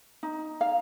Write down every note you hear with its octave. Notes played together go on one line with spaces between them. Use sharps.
D#4
F5